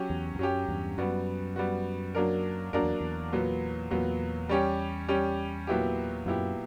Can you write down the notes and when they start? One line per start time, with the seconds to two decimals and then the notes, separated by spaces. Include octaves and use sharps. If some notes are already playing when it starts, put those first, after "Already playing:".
Already playing: F#3 C#4 G4
0.10 E2
0.35 E2
0.39 F#2 F#3 C#4 G4
0.68 E2 G2
0.98 F#2 G3 B3 F#4
1.56 G3 B3 F#4
2.15 F#3 A#3 D4 A#4
2.73 F#2 F#3 A#3 D4 A#4
2.83 E2
3.00 E2
3.33 A#2 F#3 B3
3.91 E2 A#2 F#3 B3
4.49 G3 C#4 G4
5.08 G3 C#4 G4
5.67 A#2 F#3 B3 E4 G4
6.26 F#2 A#2 F#3 B3 E4 G4